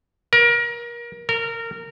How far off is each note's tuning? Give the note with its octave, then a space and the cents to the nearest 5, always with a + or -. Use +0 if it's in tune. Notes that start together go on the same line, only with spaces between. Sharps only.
A#4 +30
A#4 -20